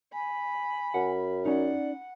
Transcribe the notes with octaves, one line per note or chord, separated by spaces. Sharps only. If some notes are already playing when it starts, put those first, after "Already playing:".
G#5 B5
F#2 F#5
C#4 D#4 D5 F#5